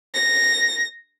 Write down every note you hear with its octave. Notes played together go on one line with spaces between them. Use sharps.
A#6